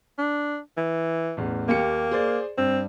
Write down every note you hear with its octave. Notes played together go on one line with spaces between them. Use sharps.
D4
E3
A1 E2
D#2 A#3 G4 C#7
G#4 C5 D5
G2 C4